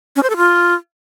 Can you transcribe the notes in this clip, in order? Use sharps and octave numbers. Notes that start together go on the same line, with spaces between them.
C#4
C5
A4
F4